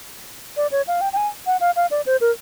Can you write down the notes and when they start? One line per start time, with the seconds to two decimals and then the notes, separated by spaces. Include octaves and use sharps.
0.57 D5
0.72 C#5
0.88 F5
1.01 G5
1.13 G5
1.17 G#5
1.47 F#5
1.61 F5
1.76 F5
1.91 D5
2.06 C5
2.21 A#4